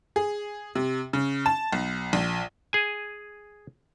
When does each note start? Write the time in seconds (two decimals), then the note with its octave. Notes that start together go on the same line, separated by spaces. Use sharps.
0.16 G#4
0.75 C3
1.13 C#3
1.46 A5
1.73 B1
2.13 A#1
2.73 G#4 G#5